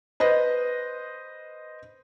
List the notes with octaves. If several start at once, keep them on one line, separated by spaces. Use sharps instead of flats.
B4 C5 D#5